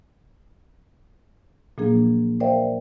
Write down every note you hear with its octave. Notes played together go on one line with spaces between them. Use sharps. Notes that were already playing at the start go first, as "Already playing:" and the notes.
A#2 F3 F#3 A#3 D4 G#4
A#4 C5 D5 E5 F5 G5